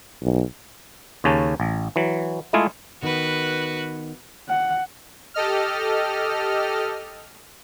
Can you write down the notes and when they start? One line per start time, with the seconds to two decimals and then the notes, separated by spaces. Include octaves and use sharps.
0.22 B1
1.24 D#2 C#3 C#4 A5
1.60 A1
1.96 E3 F#3
2.53 G#3 A3 E4 F4 G#4
3.03 D#3 B3 F#4 B4
4.49 F#5
5.34 G4 A4 D#5 F6